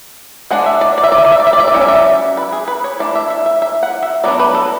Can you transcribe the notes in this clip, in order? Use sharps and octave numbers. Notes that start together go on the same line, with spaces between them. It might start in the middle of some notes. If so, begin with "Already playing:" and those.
G#3 D4 F#5
E5
D5
D5
E5
D5
E5
D5
E5
D5
E5
D5
E5
D5
F#3 C#4 E5
D5
E5
D5
B4
G#4
B4
C#5
E3 A3 D4 D5
E5
E5
E5
E5
F#5
E5
F#3 B3 D4 D5
B4
A4